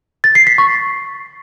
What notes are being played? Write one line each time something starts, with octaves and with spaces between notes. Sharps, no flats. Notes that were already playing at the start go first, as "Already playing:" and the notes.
A6
C7
B6
C#6